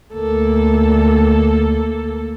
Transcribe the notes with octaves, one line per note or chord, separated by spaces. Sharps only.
D2 A#3 A4